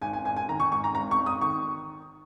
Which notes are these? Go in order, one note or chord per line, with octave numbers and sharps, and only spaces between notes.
G#1 G#5
G#5
G#1 G#5
G#5
D#3 A#5
C#6
G#2 C#6
A#5
G#1 A#5
C#6
G#1
D#6
D#3 C#6